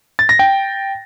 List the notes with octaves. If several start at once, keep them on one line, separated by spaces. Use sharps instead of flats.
A6
A#6
G5